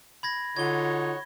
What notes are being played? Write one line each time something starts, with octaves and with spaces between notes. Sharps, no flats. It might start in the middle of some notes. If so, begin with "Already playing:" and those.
B5 G#6 A#6
D3 D#4 F4 F#4 C#5 G#6 G7